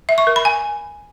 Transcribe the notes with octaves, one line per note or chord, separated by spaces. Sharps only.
E5
C#6
A#4
B5
G#5